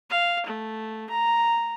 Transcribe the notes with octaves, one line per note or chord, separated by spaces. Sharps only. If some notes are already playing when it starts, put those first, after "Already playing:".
F5
A3
A#5